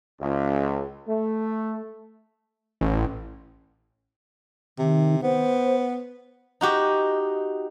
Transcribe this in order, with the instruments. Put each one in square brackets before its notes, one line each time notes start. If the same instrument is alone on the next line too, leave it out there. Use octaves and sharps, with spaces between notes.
[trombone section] C#2
A3
[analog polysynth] A1
[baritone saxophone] C3 [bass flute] D#3
[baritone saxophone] B3 [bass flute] C5
[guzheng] D#4 F#4 G4 D#5